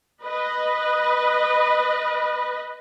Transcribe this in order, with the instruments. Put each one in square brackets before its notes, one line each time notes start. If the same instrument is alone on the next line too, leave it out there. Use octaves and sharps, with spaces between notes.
[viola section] B4 D#5